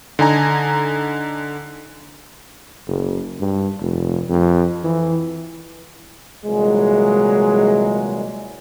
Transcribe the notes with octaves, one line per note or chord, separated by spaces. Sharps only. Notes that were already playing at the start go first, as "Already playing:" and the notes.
D3 D#4 G#5 A#5
F#1
G2
F1
F2
E3
C2 A#2 E3 F#3 G#3